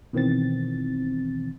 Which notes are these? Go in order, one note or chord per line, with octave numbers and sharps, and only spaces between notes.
B2 D#3 E3 C4 A6